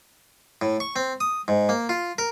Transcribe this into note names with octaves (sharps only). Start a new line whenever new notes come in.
A2
C#6
C4
D#6
G#2
A#3
F4
A#4